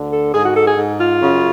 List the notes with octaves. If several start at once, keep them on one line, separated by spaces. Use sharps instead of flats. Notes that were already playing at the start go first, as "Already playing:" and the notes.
Already playing: D2 D3
A4
G#2 G#4
F#4
A4
G#4
G#2
F4
F#2 C#3